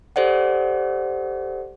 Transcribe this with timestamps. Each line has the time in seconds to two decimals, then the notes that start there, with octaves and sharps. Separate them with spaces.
0.16 G4 A4 C5 D5 F#5